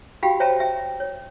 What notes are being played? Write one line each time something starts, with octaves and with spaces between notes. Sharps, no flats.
F#4 G4 F5 G5 B5
C5 C#5 E5 G5 A5 A#5
E5 G5
C#5